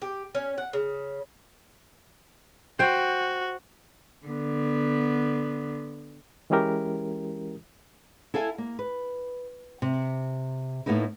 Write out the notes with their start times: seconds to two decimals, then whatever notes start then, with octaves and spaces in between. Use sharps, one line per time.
0.02 G4
0.35 C#4
0.58 F#5
0.73 C#3
2.79 F#4 C5 G5
4.26 D3 B3
6.50 E3 G#3 C#4 E4 G4 A#4
8.34 E4 A4 F5 G#5
8.58 A#3
8.79 B4
9.82 C3
10.86 A2 A#3 B3 D#4 E4